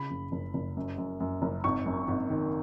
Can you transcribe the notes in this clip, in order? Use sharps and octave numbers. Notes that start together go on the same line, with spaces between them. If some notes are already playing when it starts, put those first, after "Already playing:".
Already playing: C#3 B5
F#1
F#1
F#1
F#2
F#2
F#2
F#1
G#1 C#6
F#2
G#1
D#3